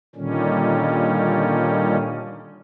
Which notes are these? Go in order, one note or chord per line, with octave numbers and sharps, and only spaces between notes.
A#2 D3 D#3 G3 C#4